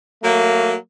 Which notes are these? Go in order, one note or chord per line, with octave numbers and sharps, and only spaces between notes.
F#3 A3 A#3